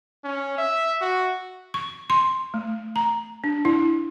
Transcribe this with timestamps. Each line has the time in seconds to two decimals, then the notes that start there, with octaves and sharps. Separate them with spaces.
0.24 C#4
0.58 E5
1.01 F#4
1.74 C#6
2.10 C6
2.54 A3
2.96 A#5
3.44 D4
3.65 E4